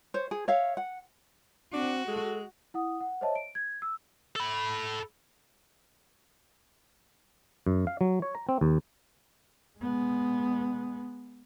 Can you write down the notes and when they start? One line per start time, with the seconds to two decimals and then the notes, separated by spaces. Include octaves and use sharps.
0.14 C5 C#5
0.31 G#4
0.48 C#5 E5 F5
0.77 F#5
1.73 C4 D4 F#4
2.08 G#3 A4
2.74 E4 F#5 D#6
3.00 F#5
3.21 C5 C#5 D#5 E5 A5
3.35 D7
3.55 G#6
3.82 E6
4.36 A4 B5
7.67 F#2
7.87 F5
8.01 F#3
8.22 C#5
8.35 A#5
8.49 C4
8.61 D#2
9.79 G#3 B3